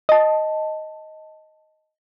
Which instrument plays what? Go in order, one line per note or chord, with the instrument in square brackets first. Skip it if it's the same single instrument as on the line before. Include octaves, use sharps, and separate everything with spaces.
[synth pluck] D#5 A5